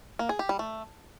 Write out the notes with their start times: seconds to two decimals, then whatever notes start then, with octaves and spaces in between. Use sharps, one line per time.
0.19 A#3
0.29 G#4
0.39 G4
0.49 G3
0.59 A3